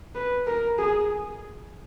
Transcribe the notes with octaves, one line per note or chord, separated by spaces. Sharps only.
B4
A#4
G#4